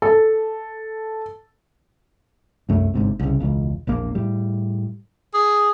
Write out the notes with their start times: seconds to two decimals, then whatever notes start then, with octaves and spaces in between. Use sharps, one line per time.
0.02 A4
2.69 C2 F#2 A3
2.94 G1 G#2 C3
3.19 C2 C#3
3.40 E1 C#2
3.87 E1 A#1 A#3
4.15 A2 G3
5.34 G#4